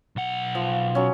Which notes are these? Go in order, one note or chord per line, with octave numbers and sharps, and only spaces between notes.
B1 F#5
F3
F#3 C#4